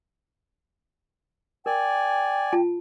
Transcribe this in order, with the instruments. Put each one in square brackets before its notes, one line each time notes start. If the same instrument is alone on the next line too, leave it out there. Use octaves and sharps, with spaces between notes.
[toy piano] A#4 [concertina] D5 G#5 [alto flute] G5
[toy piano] F4 A5